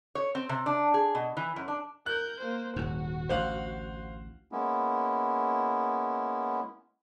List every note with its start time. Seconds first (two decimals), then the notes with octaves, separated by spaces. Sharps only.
0.15 C#5
0.35 C4
0.49 C3
0.66 D4
0.94 G#4
1.15 B2
1.37 E3
1.56 F#2
1.68 D4
2.06 A#4 F#6 G6
2.40 A#3 C5
2.76 D#1 G#2 F#4
3.29 A1 D2 C5 F5 F#6
4.52 G#3 A#3 B3 C#4 E4